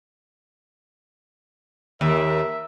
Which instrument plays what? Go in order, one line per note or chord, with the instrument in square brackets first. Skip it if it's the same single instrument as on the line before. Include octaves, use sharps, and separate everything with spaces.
[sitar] D#2 [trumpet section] A#4 E5